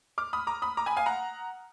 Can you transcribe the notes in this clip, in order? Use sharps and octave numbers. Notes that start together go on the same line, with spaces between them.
D6 F6
B5 D#6
A#5 D6
B5 D#6
A#5 D6
G#5 B5
F5 G#5
F#5 A#5